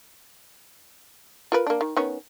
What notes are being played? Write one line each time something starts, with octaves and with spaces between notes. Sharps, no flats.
F4 A#4 B4
A#3 D4
D#3
D#3 B3 C#4